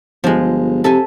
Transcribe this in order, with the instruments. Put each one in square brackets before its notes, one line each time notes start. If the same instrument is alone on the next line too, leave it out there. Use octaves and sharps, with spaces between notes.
[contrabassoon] G1 [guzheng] F3 G#3
[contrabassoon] C3 [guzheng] A4 E5 G#5